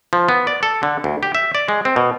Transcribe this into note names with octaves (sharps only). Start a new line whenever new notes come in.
F3
B3
D5
A4
D3
D2
G4
E5
D5
G#3
C4
B2